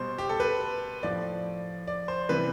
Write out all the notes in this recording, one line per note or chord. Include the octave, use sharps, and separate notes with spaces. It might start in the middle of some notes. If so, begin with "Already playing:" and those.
Already playing: B2 G3 C5
G4
A4
B4
A2 F3 D5
D5
C5
C3 E3 G3 B4